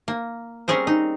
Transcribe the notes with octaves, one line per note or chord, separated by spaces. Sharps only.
A#3
G3 C4 C#4 G#4 A#4 C5
D#4